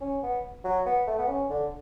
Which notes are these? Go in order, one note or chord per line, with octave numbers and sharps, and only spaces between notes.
C#4
B3
F#3
B3
A3
B3
C#4
D3